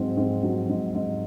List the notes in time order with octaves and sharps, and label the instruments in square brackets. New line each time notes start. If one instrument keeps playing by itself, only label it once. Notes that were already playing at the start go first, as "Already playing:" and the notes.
Already playing: [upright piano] G#2 F#3 C4
G#2 C4
F#3
G#2
G#2